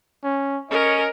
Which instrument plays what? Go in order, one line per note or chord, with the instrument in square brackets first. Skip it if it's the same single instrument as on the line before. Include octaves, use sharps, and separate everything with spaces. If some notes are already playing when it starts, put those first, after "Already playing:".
[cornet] C#4
[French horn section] C#4 [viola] A#4 [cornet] D#5